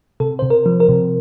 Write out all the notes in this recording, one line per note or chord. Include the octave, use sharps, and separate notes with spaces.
C3 A4
C3 C5
A#4
F3
A#4
C3